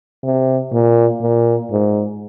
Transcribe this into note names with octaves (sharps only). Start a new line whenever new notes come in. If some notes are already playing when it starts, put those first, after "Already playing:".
C3
A#2
A#2
G#2